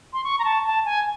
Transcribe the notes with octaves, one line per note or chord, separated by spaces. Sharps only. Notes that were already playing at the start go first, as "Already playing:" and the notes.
C6
C#6
A#5
A5
A5
G#5